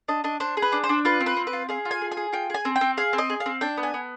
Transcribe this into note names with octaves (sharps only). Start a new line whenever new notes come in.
D4 D#5
D4 D#5
D4 C5
G#4
B4
D4
C5
D4
F4 B4
C4
B4
C4
B4
F4
G#4 F5
F4
G#5
G#4
G#5
G#4
F4 G5
G#4 G#5
C4
G5
C4
G#4 F5
C4
D#5
G#4
F5
C4
D4 G5
B3
G#5
B3